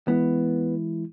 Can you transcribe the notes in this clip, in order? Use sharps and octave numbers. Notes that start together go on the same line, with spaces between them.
E3 G#3 B3 E4